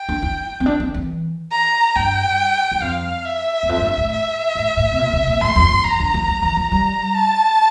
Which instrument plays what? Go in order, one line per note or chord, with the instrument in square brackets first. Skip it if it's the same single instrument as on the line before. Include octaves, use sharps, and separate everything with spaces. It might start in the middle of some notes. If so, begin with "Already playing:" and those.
Already playing: [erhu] G5
[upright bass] D4
E4
C4
D4
C4
E3
[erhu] A#5
[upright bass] G2 [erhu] G5
[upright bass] G2
[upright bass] F2 [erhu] F5
[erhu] E5
[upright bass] E2
F2
A2
G2
A2
[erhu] E5
[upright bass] A2
A2
C3
A#2
C3
A#2
[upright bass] A2 [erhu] C6
[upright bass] F2
G2
[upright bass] E3 [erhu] A#5
[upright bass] D3
E3
G3
E3
F3
[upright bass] G3 [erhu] A#5
[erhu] A5